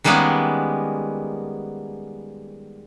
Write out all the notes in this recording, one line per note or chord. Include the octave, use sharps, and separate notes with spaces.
D#3 G3 G#3 A#3 B3 C#4